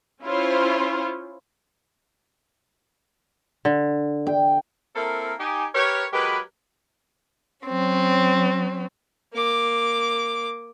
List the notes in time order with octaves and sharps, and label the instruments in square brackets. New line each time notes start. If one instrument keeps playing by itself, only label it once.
[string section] C#4 E4 F4 C5 C#5
[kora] D3
[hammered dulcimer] G5
[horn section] A#3 C4 E4 A4 A#4
D#4 G4 G#5
G4 A#4 B4 C#5
F#3 G#3 G4 A#4 B4
[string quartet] F#3 C4 C#4
[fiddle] A#3 D6